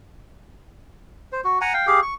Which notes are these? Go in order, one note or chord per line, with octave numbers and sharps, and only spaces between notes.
C5
F#4
F#5 G#5 A#5
F5 G5
G4 G#4 F5
C#6